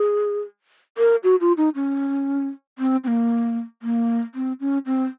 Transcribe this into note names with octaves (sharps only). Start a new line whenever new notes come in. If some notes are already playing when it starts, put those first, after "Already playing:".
Already playing: G#4
A#4
F#4
F4
D#4
C#4
C4
C4
A#3
A#3
C4
C#4
C4